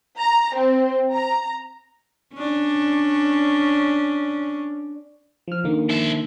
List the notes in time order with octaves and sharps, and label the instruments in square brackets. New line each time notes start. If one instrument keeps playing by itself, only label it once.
[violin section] A#5
C4
A#5
[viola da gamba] C#4 D4
[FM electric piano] F3 F6
D3 D#3 A#3
[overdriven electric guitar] F3 E5